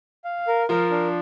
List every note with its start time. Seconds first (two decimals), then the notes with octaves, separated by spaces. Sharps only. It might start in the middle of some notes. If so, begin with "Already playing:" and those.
0.24 F5
0.47 A#4
0.69 F3 F4 A#4
0.91 D4